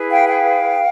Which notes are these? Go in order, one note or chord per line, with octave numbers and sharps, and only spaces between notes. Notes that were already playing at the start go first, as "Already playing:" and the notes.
Already playing: E4 G#4 B4
F5 G5
F5 G5